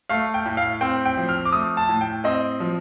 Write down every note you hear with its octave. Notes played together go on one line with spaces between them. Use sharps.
A3 F5
G5
A2
F5
C4 G5
G5
F3
F6
D6
A3 D#6
A5
A2
G5
C4 D#5
F3